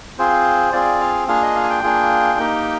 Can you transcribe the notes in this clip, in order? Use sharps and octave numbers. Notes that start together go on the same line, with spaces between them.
C4 F4 G#4 C5
C4 F4 G#4 D5
F5
A#3 D4 F4 G#4 F5
D#5
F5
G#5
G5
A#3 D4 F4 G#4
A#3 D#4 G4